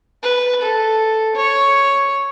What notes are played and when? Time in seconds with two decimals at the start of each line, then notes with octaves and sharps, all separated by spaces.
0.23 B4
0.62 A4
1.35 C#5